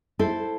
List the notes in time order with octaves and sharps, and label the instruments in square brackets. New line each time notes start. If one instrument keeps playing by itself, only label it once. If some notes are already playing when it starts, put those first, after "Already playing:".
[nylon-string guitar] E4 A4 C5